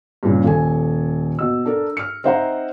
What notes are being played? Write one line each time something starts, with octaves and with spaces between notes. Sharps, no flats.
G2 A#2 C#3
D#1 A4 G#5
B2 E6
D4 A4 A#4
F6 C#7
C4 D#4 C5 E5 F#5 A#5